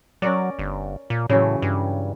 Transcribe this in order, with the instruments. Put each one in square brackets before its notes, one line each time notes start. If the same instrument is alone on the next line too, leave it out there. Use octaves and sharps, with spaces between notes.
[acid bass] F#3 [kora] C#4 A#4 D5
[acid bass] G1
A#2
[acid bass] A2 [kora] C#3 E3 F#3
[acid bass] G2